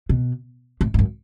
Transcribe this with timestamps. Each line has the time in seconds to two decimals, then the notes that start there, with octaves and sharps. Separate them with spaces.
0.09 B2
0.81 A2
0.94 G#2
0.99 F#2